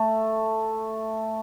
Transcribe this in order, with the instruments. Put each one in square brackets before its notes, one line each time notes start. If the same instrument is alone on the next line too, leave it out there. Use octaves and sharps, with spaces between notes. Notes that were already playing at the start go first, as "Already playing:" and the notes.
Already playing: [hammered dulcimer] A3